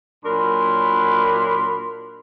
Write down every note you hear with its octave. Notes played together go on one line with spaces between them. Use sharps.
A#2 F#3 D4 A#4 B5 C6